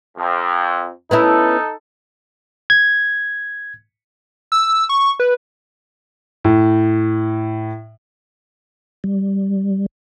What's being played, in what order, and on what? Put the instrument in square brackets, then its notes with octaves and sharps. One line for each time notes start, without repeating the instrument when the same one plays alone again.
[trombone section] F2
[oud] B3 C#4 E4 [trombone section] D#4 A4
[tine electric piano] G#6
[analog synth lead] E6
C#6
B4
[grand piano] A2
[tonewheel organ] G3